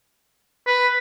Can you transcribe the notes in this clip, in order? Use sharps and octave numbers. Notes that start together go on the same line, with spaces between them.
B4